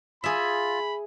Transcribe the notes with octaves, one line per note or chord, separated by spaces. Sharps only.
F4 G#4 E5 B5